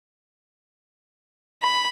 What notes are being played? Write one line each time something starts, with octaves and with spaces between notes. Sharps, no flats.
B5